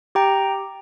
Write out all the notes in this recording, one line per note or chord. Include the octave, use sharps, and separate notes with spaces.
G4 G5 A#5